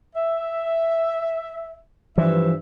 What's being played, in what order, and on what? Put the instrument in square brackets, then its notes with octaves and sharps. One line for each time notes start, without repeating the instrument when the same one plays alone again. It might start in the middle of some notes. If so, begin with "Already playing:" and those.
[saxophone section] E5
[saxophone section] G2 E5 [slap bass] E3 F3